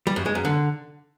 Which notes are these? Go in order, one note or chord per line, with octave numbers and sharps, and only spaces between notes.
G3
F#2
G#3
F#2
D3